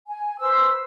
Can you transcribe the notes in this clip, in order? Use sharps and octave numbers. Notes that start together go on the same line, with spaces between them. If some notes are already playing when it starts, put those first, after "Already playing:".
G#5
B4 C5 E6